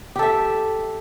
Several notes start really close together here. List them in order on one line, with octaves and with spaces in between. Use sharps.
G4 A4 E5